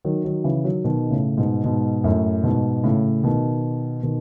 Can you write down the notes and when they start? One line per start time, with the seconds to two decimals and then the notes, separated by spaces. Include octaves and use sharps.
0.05 D#3 F#3
0.25 D#3 F#3
0.44 C#3 E3
0.64 D#3 F#3
0.84 B2 D#3
1.11 A2 C#3
1.37 G#2 B2
1.64 G#2 B2
2.04 F#2 A2
2.43 G#2 B2
2.84 A2 C#3
3.24 B2 D#3
4.03 B2 D#3